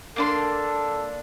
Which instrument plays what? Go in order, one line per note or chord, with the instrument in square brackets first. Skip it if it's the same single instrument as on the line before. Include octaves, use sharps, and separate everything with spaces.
[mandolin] A#3 D4 C6 [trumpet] A4